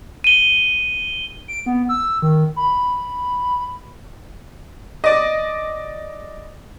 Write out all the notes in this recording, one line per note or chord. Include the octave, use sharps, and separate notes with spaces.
D#7 G7
D7
B3
E6
D#3
B5
D5 D#5